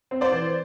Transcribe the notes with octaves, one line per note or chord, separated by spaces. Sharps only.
C4
C5 D5
E3